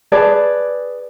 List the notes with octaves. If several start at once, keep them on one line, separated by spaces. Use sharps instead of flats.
G#4 B4 D5 A5